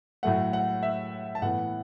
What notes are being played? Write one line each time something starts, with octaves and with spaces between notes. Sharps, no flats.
A2 F#3 A3 F#5
F#5
E5
A5
A2 E3 B3 F#5